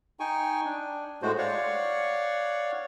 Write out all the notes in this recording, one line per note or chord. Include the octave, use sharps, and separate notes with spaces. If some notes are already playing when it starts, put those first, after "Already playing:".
D#4 G5 G#5 C#6
D4
A2 G#3 A3 F#4 C5
C#5 D5 F5 F#5 C#6